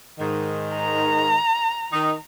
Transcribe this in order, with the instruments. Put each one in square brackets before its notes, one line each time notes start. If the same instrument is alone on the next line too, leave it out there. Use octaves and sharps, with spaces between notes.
[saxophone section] G#2 D#3
[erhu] A#5
[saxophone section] D#3 D#4